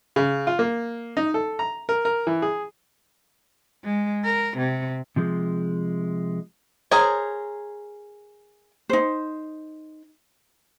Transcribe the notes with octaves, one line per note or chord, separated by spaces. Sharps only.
C#3
F4
A#3
D#4
A4
A#5
A#4
A#4
E3
G#4
G#3
A#4
C3
C3 F3 G#3
G#4 A#4 C5 C#5
D#4 C5